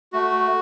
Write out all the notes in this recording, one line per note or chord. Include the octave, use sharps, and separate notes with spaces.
A3 F#4